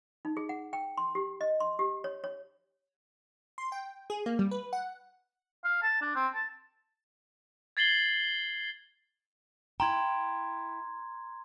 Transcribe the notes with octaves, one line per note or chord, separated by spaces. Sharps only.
D#4
G#4
F#5
G5
C6
G4
D#5
C6
G4
C#5
C#5
C6
G5
G#4
A#3
G3
B4
F#5
F5
A5
D4
C4
A5
G#6 A6 C7 F#7 G7
E4 G5 A#5 C6 G#6